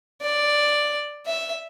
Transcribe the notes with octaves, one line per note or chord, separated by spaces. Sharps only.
D5
E5